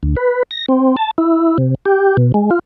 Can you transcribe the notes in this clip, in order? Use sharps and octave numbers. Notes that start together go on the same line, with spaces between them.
D2
B4
A#6
C4
A5
E4
C3
G4
B2
G#3
F4